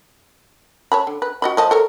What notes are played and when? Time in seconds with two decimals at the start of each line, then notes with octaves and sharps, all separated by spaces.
0.92 C#5 A5 B5
1.07 D3
1.22 B4
1.42 F#4 D#5 B5
1.57 F3 D#5 A5
1.71 A4 A#4 C#5